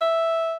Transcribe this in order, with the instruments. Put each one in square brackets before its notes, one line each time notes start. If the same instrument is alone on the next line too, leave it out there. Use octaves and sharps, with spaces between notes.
[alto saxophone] E5